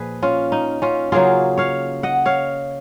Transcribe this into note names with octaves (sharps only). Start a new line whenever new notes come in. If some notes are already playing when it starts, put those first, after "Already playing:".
Already playing: A#2 F3 G#4 B4
C#4 F4
D#4
C#4 F4
C#3 F#3 A#3 F4 G#4
C#5 F5
D#5 F#5
C#5 F5